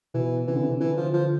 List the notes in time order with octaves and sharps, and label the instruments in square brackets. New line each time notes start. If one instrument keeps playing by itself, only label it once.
[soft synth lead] B2 [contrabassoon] E3
[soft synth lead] C3 [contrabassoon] E3
[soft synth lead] D3
C3
[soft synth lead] D3 [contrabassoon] E3
[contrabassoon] F3
F3